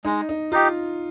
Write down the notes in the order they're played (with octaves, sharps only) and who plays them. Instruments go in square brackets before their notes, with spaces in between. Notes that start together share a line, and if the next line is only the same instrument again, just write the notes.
[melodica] G#3 [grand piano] D#4
[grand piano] D#4
[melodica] D#4 G4 [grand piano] F4